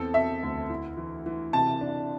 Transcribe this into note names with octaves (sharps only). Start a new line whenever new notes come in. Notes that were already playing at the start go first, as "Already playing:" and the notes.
Already playing: E2 C4 E4 A4
C4 E5
D2
E4
E3
E3
C3 A5
D4